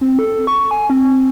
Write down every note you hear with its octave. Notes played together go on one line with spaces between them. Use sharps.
C4
A4
C#6
G#5
C4